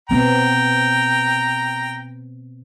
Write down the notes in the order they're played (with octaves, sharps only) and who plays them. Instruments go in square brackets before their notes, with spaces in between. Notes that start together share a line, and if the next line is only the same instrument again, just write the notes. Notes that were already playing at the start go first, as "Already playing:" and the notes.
[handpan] B2 B3 C4 [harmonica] G5 A#5